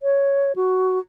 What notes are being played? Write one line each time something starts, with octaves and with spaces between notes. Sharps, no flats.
C#5
F#4